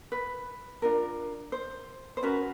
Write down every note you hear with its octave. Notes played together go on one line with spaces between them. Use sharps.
B4
D4 F4 A#4
C5
C5
C#4 F#4 A#4 B4